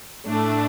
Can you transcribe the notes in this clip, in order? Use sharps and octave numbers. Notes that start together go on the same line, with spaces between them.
A2 A3 D4